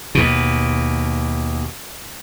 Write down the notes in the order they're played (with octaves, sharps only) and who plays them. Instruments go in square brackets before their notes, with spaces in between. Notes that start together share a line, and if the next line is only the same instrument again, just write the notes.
[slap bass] D#2 B2